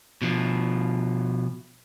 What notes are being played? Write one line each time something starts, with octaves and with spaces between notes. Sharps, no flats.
B2 F3